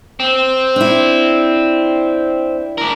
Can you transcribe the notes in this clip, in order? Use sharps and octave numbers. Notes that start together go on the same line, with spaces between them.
C4
D4 E4
D4 A#4